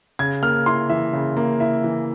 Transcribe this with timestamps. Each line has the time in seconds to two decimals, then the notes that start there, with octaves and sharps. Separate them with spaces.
0.19 C#3 G#6
0.43 A#3 F6
0.66 E4 C6
0.89 E3 E5
1.13 C#3
1.37 A#3
1.60 E4 E5
1.84 E3